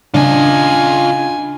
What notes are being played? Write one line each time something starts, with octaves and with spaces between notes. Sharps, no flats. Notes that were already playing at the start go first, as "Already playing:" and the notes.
C#3 D4 F4 D#5 G#5